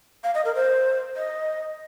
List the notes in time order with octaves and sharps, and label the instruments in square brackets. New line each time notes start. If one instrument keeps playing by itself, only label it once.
[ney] F5
D#5
A#4
C5
D#5